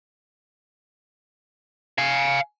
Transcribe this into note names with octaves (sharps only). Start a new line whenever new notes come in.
F5 G#5